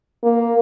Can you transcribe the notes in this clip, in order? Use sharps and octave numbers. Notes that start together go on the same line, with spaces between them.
A#3